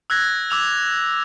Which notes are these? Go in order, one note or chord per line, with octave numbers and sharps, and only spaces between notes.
E6 F#6 G#6 A#6
D6 E6 F7